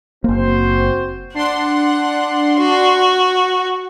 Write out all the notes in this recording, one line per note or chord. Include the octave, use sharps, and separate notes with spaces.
F#1 A#3 C4 F#4 C5
D4 F#5 C6
F#4